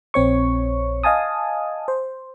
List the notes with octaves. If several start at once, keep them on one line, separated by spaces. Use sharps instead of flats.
A#1 C4 C#5 C#6
D#5 F5 G#5 A5 D#6
C5